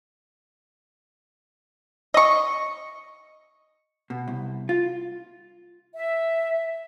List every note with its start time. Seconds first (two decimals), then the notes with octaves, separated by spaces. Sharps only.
2.14 D#5 C#6
4.10 B2
4.28 C2
4.69 F4
5.95 E5